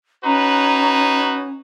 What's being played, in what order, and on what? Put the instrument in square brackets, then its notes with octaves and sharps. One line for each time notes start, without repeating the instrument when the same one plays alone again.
[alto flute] C#4 [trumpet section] D#4 F#4 B4 [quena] A#5